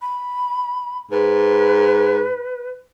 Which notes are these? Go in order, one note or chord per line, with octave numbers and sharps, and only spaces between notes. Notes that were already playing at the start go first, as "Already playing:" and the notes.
B5
G#2 B4